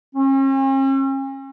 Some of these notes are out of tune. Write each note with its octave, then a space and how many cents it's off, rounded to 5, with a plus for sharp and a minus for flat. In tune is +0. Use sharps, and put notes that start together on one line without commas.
C#4 -45